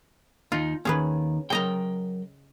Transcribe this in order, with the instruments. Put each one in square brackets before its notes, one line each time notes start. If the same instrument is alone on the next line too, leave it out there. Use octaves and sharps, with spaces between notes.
[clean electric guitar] D#2 D#4 [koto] F4
[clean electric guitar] D#2 D#3 [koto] C#4 G#4 B4
[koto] C#3 D#5 A#5 [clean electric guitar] F#3 A#4 G5